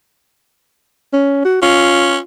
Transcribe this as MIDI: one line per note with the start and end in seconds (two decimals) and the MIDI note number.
1.13 1.44 61
1.45 1.57 66
1.62 2.17 61
1.62 2.23 65